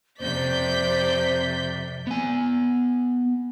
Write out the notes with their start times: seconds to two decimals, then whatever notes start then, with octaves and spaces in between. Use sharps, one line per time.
0.20 F2 C3 C5 D5 G6 B6
2.07 B3 G#5